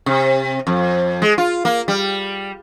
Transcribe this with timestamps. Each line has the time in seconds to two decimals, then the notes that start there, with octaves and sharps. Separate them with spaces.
0.06 C3
0.67 F2
1.22 G#3
1.38 F4
1.65 A#3
1.88 G3